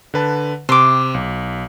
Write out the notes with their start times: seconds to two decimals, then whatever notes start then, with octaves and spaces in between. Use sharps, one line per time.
0.14 D3 B4 A5
0.69 C3 C6 D6
1.14 B1